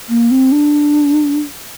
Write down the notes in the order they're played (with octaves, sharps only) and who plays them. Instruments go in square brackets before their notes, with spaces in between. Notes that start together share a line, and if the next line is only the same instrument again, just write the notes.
[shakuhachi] A#3
C4
D4